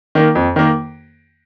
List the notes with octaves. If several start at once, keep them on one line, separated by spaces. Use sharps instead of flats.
D#3 A#3
F2
D#3 A#3